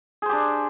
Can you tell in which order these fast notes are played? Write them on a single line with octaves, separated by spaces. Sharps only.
G#4 C5 G4 D4